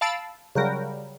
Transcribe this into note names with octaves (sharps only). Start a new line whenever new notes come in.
F5 A5 B5 E6 A6 D7
C#3 F#3 G3 A#4